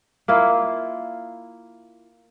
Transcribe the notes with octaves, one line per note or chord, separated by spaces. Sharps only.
A#3 E4 F4